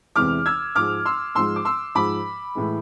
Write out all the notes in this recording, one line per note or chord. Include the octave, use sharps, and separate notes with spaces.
E2 C3 E3 G#3 D6 F6
E6 G#6
G#2 F3 G#3 D6 F6
C6 E6
G#2 F3 G#3 C6 E6
D6
C6 E6
G#2 F3 G#3 B5 D6
A2 E3 G#3